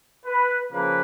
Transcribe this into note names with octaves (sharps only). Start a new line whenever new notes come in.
B4
C#3 F3 A#3 B4